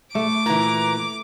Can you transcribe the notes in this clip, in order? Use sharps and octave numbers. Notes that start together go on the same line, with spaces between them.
A3 D6
A#2 E3 A#5